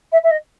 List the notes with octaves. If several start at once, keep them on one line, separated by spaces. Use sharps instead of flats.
E5
E5
D#5